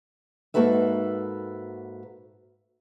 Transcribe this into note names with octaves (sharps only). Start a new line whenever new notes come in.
G#2 A#3 F#4 A4 B4 E5